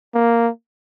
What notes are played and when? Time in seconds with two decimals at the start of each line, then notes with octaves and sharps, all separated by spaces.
0.14 A#3